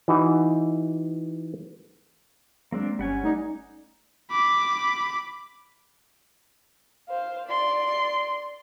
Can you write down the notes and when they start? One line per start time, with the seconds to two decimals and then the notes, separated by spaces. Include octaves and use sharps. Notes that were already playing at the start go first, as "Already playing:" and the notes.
0.08 E3 D#4 F#4
2.72 F#3 G#3 A#3 C4 D4
2.99 G1 G3 C#4 F#5 G#5
3.24 A3 D#4 D5
4.31 B5 D6
7.09 C5 F5
7.46 D5 C6